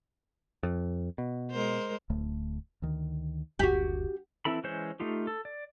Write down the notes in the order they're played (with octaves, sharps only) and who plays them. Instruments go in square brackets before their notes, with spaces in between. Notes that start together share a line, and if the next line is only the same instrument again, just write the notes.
[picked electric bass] F2
B2
[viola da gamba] G#3 A#4 C5
[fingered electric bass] D1 D2 A3
D2 D#3
[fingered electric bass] F#1 D2 [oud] F#4 G4
[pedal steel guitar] E3 C4 E4 A4 B5
E3 G#3 C#4 C5 G6
A3 D#4 F4 G4
A4
D5